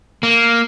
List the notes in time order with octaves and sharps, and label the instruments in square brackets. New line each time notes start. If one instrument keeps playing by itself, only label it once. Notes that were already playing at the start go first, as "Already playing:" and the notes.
[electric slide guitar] A#3